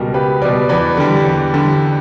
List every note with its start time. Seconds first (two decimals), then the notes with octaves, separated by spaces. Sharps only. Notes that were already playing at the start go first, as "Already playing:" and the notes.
Already playing: C#2 B2 G3 F#4 A#4
0.14 C#2 G4 B4
0.42 B2 G3 B4 D5
0.69 E2 B4 D5
0.97 D3 G3
1.25 E2
1.54 D3 G3